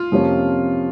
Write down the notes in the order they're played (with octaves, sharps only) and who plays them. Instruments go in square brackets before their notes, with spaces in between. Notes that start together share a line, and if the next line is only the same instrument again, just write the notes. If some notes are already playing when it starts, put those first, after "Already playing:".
Already playing: [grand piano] F4
[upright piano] F2 C3 F3 A#3 C#4